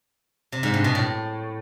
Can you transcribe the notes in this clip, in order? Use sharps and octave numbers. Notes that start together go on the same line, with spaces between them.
C3
G#2
G2
B2
A2